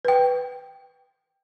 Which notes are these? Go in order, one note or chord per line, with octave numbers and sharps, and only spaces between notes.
B4 G5